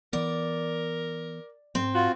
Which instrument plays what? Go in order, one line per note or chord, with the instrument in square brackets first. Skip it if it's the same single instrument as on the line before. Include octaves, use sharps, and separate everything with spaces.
[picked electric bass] E3 B3 [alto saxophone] A#4 [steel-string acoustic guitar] D5
[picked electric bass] G#2 [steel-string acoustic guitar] C4
[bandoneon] F4 [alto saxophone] F#4